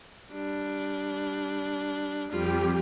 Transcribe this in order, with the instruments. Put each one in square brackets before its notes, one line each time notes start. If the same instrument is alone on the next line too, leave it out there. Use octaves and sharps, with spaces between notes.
[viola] G3 D4
[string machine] F2 G4 [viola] G3 F4